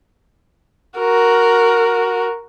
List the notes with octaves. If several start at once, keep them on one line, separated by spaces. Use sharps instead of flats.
F#4 A#4